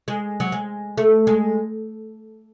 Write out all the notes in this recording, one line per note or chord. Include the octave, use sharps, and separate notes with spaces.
G#3
F#3
G#3
A3
G#3